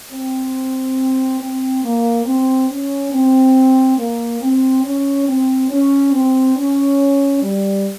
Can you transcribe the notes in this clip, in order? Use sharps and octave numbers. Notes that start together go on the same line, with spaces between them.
C4
C4
A#3
C4
C#4
C4
A#3
C4
C#4
C4
C#4
C4
C#4
G3